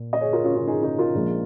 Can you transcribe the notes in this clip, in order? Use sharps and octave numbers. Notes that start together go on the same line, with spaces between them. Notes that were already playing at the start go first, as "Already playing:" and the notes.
Already playing: A#2
D#5
G#4 C#5
F4 A#4
C#4 F4
C#4 F4
D#4 G#4
D#4 G#4
F4 A#4
A#1 A#2 F3 G#3